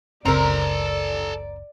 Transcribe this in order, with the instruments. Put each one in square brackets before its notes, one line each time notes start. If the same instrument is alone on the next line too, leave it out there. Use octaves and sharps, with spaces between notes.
[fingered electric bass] F#1 C#2 C#3 [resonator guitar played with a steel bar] C4 A#4 [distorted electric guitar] A4 A#5 [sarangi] D5